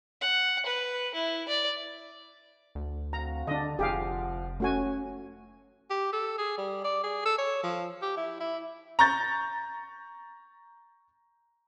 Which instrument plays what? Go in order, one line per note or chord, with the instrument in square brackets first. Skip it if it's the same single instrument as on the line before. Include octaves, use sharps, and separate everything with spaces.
[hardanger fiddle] F#5
B4
E4
D5
[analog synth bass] D2
[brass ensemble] C4 F#4 F5 [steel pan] A#5
[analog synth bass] D3 [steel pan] D4 D#5
[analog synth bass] F1 [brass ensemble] F3 F#5 [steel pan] G4 G#4 F5
[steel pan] A3 F#4 G#5 [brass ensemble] C#4
[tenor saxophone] G4
A4
G#4
G3
D5
G#4
A4
C#5
F3
G4
E4
E4
[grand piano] A#5 C#6 G6 A6